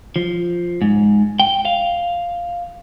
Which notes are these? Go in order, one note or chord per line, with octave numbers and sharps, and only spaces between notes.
F3
G#2
G5
F5